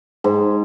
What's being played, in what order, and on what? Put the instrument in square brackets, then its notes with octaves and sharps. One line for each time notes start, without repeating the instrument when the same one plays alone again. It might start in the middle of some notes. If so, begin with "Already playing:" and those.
[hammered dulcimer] G#2